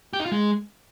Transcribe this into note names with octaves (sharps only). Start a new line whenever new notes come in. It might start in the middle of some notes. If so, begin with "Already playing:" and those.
G4
D#4
F4
G#3